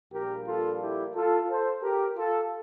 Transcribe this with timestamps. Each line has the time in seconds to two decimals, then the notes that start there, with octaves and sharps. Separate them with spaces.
0.12 A#1 A#2 G3 A#3 G4 A#4
0.47 F4 A4
0.81 E4 G4
1.15 F4 A4
1.49 A4 C5
1.82 G4 A#4
2.16 F4 A4